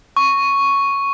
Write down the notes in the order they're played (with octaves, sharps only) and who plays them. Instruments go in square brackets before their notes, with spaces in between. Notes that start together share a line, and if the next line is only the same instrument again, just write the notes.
[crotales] C#6